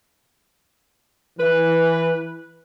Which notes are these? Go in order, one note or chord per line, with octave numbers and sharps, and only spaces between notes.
E3 B4